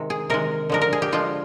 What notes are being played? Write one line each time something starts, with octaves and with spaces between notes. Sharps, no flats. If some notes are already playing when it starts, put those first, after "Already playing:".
Already playing: C3 D#3 G#3
G#4
C3 D#3 G#3 A#4
D3 F3 G#3 A#4
A#4
G#4
G4
D3 F3 G#3 F4